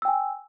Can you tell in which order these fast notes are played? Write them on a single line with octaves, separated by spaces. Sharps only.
E6 G5 G#5